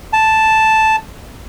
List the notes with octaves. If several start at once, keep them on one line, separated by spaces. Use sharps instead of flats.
A5